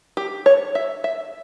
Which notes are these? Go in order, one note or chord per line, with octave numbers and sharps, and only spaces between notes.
G4
C#5
E5
E5